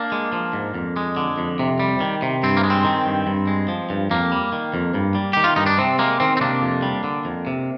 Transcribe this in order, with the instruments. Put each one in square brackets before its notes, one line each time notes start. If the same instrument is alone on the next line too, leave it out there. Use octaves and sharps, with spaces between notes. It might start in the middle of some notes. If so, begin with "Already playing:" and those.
Already playing: [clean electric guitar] A#3 D4
G#3
F3
G#2
F2
G#3
D3
F2
C3
G3
D#3
C3
G2 C4
A#3
G#3
C4
D#3
G2
G2
G#3
F3
G2
F2 A#3
G3
D#3
F2
G2
G3
D#3 G4
F4
G2 D#4
D4
C3 C4
G#3 A#3
D#3 C4
C4
C3 A#3 D4
F2
G3
D3
F2
C3